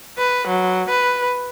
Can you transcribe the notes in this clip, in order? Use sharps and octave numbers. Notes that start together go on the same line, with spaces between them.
B4
F#3
B4